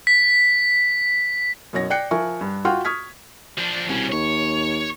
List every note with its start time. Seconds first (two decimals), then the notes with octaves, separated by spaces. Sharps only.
0.07 B6
1.73 F#2 B2 C#5 A#6
1.90 D5 G5 F#6 C7 C#7
2.11 F3 A#4 E5 G#5 C#6
2.41 G2
2.65 F4 F#4 F#5 G5 C6 F6
2.85 C#6 D#6 F6 G#6 B6
3.58 F3 D4
3.89 C2 B2 C#4
4.12 D#2 C#5